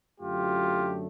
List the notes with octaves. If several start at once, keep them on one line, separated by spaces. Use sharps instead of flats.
F#2 D3 F#3 A3 F4 G4